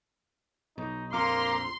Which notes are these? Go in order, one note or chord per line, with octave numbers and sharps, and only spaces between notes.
B1 D#4
A#1 F2 A#3 A#5 C6 D6 F6